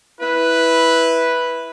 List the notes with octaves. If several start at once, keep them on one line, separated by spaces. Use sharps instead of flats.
E4 B4